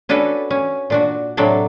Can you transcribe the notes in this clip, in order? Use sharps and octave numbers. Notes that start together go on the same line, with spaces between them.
C#4 D4 F#4 A4 B4
C#4
A#2 D4 F#4
A2 C3 F#3 D4 A4